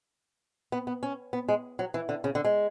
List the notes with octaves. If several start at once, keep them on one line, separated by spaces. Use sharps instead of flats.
B3
B3
C#4
B3
G#3
F#3
E3
D3
C#3
D3
G#3